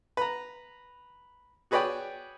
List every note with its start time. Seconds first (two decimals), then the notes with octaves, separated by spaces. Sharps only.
0.17 B4 A#5
1.71 F#4 G#4 B4 C#5 D5 G5